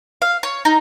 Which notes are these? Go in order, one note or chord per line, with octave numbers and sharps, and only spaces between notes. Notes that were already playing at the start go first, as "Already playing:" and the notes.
F5
C#5
D#4